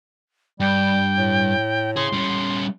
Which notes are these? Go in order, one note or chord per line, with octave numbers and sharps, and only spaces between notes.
G2 G3 G5
A2
G#4 C#5 C6
G3 C#4